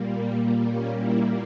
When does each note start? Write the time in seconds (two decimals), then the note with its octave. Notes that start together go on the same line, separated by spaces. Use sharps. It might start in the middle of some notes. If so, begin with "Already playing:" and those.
Already playing: A#2 G3 A#3
0.65 C#4
0.95 E4